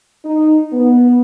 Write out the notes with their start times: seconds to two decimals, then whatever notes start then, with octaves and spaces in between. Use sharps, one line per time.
0.25 D#4
0.72 B3